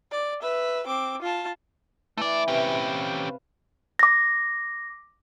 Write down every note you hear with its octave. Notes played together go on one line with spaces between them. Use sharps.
D5
B4 E5
C4 D6
F4 A5
E3 A3 D5
C3 C#4 G4 B4 G#5
F5 A5
D6 A#6